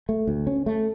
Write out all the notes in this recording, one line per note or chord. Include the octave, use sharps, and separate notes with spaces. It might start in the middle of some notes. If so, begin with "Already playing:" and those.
A3
D2
C#4
A3